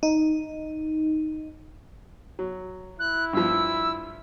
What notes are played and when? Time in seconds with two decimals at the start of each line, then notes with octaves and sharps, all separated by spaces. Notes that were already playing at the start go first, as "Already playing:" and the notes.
0.03 D#4
2.39 F#3
2.99 E4 F#6
3.33 G2 F3 E6